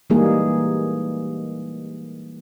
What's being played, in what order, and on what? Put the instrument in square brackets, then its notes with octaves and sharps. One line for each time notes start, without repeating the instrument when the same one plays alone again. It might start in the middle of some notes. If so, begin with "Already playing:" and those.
[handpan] E3 G3 G#3 A#3 D#4 G#4